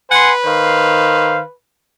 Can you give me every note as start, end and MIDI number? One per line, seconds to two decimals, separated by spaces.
0.11 1.55 71
0.11 0.31 78
0.11 0.31 80
0.11 0.31 84
0.44 1.40 51
0.44 1.40 72
0.44 1.40 77